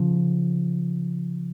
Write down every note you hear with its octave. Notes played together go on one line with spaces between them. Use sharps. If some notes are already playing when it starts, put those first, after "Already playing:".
Already playing: C#3 F3